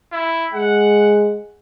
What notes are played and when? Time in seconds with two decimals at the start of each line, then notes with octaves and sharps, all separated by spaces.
0.12 E4
0.53 G#3 F#5